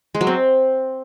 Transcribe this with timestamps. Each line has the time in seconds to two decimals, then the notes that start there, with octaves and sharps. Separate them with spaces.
0.15 G#3
0.21 F#3
0.27 C4